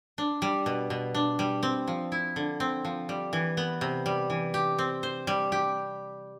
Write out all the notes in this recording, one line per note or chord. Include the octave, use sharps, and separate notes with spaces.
D4
G3
B2
B2
D4
G3
C4
F3
E4
D3
C4
F3
G3
E3
B3
C3
G3
E3
G4
C4
C5
G3
G4